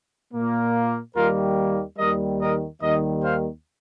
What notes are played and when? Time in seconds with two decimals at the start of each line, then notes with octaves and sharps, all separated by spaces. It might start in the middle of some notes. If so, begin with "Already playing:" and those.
0.34 A#2 A#3
1.15 D#2 D#3 G3 A#3 F4 A#4
1.98 D#2 D#3 G3 A#4 D#5
2.41 A#4 D#5
2.81 D#2 D#3 G3 A#4 D#5
3.22 C5 F5